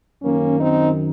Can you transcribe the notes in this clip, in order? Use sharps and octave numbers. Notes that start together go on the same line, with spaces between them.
F#2 D#3 A#3 C#4
C4 D#4